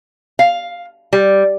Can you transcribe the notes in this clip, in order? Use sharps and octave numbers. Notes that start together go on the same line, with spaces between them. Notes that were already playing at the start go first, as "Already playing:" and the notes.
F5
G3